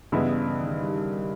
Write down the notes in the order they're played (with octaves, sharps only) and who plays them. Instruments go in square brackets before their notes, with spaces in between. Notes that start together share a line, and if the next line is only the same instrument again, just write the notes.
[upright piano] G2 E3 G#3 B3 E4 [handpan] C#3
[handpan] D#3
D#3
G3
G3